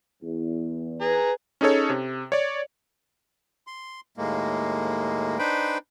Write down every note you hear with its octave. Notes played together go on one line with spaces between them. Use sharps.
E2
G#4 B4 A#5
C#4 D#4 G#4 A4 C#5
C3
C#5 D5
C6
D#2 A2 G#3 A#3
D4 D#4 B4 C5 G5 B5